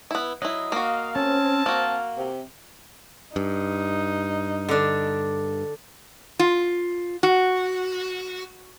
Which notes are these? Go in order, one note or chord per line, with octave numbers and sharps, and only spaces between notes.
B3 E4
F#3 E4 D#5
A#3 F#4 F5
C4 C#4 A5
A#3 F#4 F5
C3
G2 D#4
D3 D4
F4
F#4